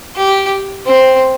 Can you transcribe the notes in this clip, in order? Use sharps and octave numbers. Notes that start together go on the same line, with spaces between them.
G4
C4